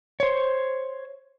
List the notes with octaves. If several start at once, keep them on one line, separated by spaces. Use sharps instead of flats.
C5 C#5